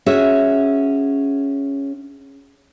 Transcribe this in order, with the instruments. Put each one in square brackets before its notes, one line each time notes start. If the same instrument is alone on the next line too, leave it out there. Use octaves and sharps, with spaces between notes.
[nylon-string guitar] C#4 F#4 G#4 E5